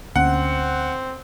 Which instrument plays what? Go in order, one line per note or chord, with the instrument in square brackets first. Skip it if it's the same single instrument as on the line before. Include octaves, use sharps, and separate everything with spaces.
[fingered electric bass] D2 A#3 C#4 [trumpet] C4 [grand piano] F#5